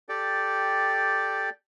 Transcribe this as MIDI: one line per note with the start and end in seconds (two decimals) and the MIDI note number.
0.09 1.50 67
0.09 1.50 69
0.09 1.50 74
0.09 1.50 79